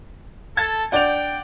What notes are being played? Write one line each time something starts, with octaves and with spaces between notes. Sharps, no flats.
A4 A5 G#6 A6
D4 D5 F#5 G5 G6 F7